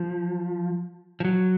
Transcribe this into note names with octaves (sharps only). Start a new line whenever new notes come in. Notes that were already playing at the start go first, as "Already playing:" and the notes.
Already playing: F3
F3
F#3